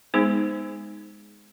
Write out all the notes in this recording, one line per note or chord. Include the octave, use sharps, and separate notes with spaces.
G#3 B3 D#4 G#4 C5